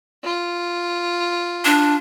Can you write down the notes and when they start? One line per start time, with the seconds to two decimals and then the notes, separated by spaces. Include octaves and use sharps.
0.24 F4
1.65 D4